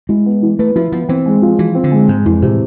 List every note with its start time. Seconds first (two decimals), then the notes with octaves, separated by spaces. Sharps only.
0.09 G#3 E4
0.26 B3
0.42 E3
0.59 A3 B4
0.76 F3 E4
0.92 F3 B3
1.09 E3 C4
1.26 G#3
1.42 F3
1.59 E3 F3
1.75 C4
1.84 D3
1.92 G#3
2.09 G#2 G#3
2.25 F2 E3
2.42 A2 C3